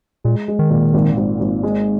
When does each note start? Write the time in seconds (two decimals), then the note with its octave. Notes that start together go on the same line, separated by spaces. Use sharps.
0.24 A#2 G#3
0.48 G#3
0.59 D#3
0.70 A#2
0.94 G#1
1.17 G#1
1.40 G#1
1.63 G#3